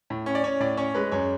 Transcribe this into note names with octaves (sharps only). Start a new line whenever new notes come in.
A2
C#4
D5
C#4 C#5
A2 D5
C#4 C#5
G#3 B4
F#2 C#5